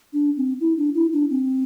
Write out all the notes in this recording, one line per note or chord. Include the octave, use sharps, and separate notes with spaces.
D4
C4
E4
D4
E4
D4
C4